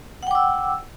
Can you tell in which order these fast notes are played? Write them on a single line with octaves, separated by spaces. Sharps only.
F#5 G5 D6 E6